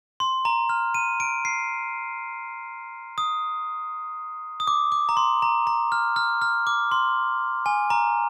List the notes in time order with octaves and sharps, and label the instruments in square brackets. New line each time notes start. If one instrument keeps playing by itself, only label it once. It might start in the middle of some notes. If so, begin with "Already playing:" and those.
[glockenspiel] C6
A#5
F6
D#7
D7
C7
D#6
D#6
D6
D6
A#5
C6
A#5
A#5
F6
F6
F6
D6
C6
G#5
A#5